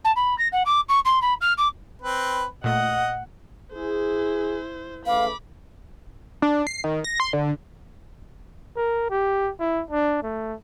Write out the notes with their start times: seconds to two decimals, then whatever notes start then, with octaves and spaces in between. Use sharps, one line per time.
0.04 A5
0.16 B5
0.38 A#6
0.52 F#5
0.65 D6
0.89 C#6
1.05 C6
1.22 B5
1.41 F6
1.57 D6
2.02 C4 B4
2.64 A#2 A3 D#5 F#5
3.73 E4 G#4 C5
5.06 C#3 A3 B4 F5 B5 D6
6.42 D4
6.67 C7
6.84 D#3
7.04 A#6
7.20 C6
7.33 D3
8.76 A#4
9.10 G4
9.60 E4
9.91 D4
10.22 A3